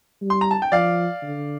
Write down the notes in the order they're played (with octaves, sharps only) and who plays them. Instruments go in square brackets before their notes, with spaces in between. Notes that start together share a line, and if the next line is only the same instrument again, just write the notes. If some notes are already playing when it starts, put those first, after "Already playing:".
[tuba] G3
[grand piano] C6
A#5
A5
G5
[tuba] F3 [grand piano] D5 F5
[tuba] D3